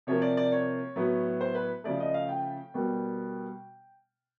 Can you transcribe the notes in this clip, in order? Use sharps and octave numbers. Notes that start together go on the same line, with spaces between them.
C3 F3 A#3 C#5
D5
D5
C#5
A2 F#3 B3
C5
B4
C#3 F3 A3 D5
D#5
F5
G5
B2 G3 A#3